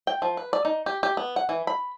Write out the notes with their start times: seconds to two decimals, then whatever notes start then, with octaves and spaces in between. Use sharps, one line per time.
0.07 G5
0.22 F3
0.37 B4
0.53 D5
0.65 D#4
0.86 G4
1.03 G4
1.17 B3
1.36 F#5
1.49 E3
1.67 B5